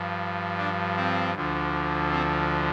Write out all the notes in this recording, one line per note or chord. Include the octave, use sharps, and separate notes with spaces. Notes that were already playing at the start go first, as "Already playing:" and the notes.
Already playing: G2 F3
D4
C4
D2 D3 F3
C4